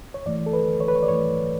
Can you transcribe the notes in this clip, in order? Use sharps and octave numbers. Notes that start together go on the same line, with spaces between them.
C#5
F#2 E3 A3 D5
A4
B4
C#5
B4
C#5
D5
F#2 E3 A3 C#5